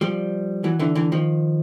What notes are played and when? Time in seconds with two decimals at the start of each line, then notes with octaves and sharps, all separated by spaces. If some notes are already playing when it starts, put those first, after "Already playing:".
0.01 F3 G3
0.64 E3 F#3
0.79 D3 E3
0.95 D3 E3
1.12 D#3 F3